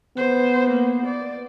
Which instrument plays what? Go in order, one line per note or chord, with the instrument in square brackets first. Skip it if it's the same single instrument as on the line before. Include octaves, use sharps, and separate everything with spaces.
[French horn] B3 [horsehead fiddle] C5
[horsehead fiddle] A#3
D5